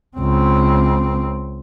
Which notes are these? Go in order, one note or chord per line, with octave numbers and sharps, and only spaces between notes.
C#2 C4